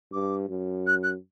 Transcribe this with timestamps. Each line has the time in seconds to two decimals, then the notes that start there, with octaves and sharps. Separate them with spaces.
0.12 G2 D6
0.49 F#2
0.86 F#6
1.03 F#6